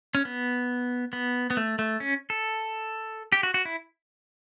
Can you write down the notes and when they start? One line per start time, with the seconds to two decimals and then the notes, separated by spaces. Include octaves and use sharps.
0.15 C#4
0.25 B3
1.13 B3
1.50 B3
1.57 A3
1.79 A3
2.00 C#4
2.30 A4
3.32 G4
3.43 F#4
3.54 F#4
3.65 E4